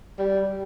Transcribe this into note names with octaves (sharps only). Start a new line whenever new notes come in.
G3